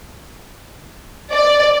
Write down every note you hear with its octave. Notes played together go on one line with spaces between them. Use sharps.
D5